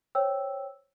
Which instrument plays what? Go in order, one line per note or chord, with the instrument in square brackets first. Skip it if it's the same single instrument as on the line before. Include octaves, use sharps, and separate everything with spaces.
[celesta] C5 C#5 G5 E6